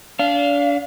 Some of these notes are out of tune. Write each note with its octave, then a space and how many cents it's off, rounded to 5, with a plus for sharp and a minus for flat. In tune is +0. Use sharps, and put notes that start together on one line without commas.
D4 -35 F5 -5